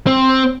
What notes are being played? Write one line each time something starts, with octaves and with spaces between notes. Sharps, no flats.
C4